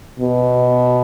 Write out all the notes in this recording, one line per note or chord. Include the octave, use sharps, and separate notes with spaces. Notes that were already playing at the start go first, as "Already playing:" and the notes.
B2